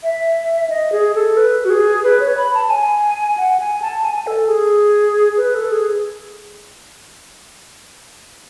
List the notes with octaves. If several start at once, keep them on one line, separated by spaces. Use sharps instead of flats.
E5
D#5
G#4
A4
B4
F#4
G#4
B4
C#5
B5
A5
G#5
F#5
G#5
A5
G#5
A4
G#4
B4
A4
G#4